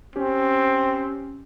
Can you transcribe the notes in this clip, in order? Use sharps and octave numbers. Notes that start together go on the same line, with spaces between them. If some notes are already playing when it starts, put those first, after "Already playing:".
C4 C#4 G4